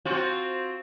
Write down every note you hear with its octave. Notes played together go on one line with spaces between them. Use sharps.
C4 F4 F#4